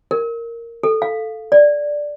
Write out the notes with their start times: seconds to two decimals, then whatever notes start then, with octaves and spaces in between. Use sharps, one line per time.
0.11 A#4
0.83 A4
1.02 F5
1.52 D5